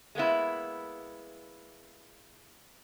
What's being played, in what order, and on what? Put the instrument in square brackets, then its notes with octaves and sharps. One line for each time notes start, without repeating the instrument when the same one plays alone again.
[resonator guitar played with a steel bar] G#3 A#3 B3 E4